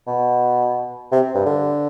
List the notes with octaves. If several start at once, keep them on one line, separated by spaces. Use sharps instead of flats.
B2
C3
G2
D3